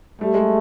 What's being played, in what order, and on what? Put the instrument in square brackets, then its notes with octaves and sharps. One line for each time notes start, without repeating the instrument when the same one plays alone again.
[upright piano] G3 [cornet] A3
[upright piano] G#3